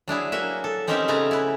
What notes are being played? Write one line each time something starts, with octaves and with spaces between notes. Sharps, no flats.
F#3 D4 E4 G#4
A#3 F#4 E5
A4
C4 C#4 D#4 G4 A#4 E5
C#3 A3 B3 G#5 A#5
E4 B4